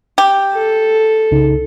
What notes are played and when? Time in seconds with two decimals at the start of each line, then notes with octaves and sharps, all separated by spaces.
0.18 G4
0.54 A4
1.31 C2 C#3 D#4